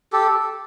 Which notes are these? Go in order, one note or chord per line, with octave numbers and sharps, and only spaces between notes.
G4 A4